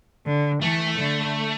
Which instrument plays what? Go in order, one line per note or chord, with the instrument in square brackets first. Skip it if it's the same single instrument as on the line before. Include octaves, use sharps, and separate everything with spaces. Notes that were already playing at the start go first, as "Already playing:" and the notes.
[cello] D3
[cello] E3 [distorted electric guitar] A3
[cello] D3